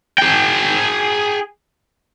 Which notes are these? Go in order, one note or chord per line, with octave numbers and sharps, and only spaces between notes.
G#4 G5